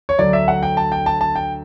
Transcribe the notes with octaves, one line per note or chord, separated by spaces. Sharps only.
C#5
D2 D3 F#3 D5
E5
F#5
G5
A5
G5
A5
A5
G5